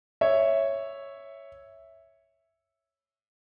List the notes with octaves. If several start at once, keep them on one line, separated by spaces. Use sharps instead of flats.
C#5 E5